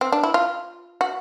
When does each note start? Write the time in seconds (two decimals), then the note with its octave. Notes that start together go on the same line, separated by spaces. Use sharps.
0.01 C4
0.12 D4
0.24 E4
0.34 F4
1.01 F#4